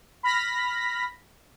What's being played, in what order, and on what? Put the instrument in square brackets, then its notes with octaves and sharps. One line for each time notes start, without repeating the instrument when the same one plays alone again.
[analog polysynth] B5 F6 A#6 B6